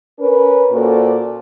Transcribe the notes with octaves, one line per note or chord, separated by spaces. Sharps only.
C#4 A#4 B4
A#2 A#3 F#4 A4 C5 D5